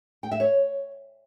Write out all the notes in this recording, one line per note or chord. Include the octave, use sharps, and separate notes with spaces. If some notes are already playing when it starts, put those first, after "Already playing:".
G5
E5
C#5